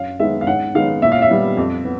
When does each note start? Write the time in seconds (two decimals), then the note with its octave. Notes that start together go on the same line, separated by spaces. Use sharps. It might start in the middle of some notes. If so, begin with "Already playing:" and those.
Already playing: F#2 F5
0.19 D#3 G#3 B3 E5
0.41 F5
0.47 G#2 F#5
0.75 D#3 G#3 B3 F5
1.02 A#2 E5
1.12 F5
1.22 E5
1.30 G3 B3
1.57 F2
1.85 B3